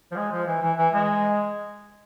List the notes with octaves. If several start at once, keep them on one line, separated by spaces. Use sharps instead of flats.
F3
G#3
F3
E3
E3
E3
G#3